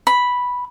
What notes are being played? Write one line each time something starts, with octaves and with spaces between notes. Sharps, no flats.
B5